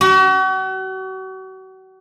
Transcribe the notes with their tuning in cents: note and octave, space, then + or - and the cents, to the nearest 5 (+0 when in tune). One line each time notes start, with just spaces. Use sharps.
F#4 +40